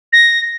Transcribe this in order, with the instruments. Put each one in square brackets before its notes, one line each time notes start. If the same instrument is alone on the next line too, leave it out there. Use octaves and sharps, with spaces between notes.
[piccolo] A#6